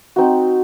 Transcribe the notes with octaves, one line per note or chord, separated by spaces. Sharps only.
C4 D#4 F#4